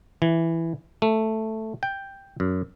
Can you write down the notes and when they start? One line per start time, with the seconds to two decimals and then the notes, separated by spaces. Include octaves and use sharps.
0.22 E3
1.02 A3
1.83 G5
2.40 F#2